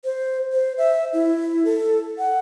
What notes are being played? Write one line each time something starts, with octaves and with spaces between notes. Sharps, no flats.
C5
C5
E5
E4
A4
F#5